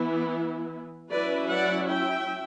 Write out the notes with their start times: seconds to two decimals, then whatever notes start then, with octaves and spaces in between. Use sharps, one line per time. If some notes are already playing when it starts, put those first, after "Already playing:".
Already playing: E3 B3 E4
1.10 F#3 C#4 E4 B4 D5
1.51 D5 F#5
1.91 E5 G5